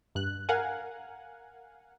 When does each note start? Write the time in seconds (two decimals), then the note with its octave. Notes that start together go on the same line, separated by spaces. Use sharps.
0.15 G2 F#6
0.49 A#4 F5 F#5 G#5